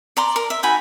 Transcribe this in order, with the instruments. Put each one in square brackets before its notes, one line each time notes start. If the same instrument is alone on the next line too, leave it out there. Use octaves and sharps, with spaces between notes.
[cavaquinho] D5 A#5 C6
A#4
E5
D#4 F#4 G#5 B5